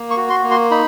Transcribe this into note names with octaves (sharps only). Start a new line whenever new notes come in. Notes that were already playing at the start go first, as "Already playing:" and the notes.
Already playing: A#3
C#6
F#4
C6
A#3
C6
D#4 B5